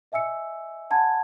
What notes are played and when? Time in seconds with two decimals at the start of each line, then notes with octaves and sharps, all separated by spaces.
0.12 D#5 E5 G#5 E6 C#7
0.90 F#5 G#5 A5 B5 G#6